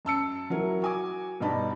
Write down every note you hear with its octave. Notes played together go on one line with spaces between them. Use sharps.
F#2 A5 E6 C#7
F#3 E4 A#4
F#4 G#5 D6
G2 B2 D#4 A5 B5